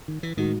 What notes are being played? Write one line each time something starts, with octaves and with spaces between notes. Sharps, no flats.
D#3
E3
A2 D#3 G#3 D#4 F#4